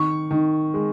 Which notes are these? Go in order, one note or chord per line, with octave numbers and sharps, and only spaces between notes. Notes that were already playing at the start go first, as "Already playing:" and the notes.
Already playing: D#3 C#6
D#3
G#3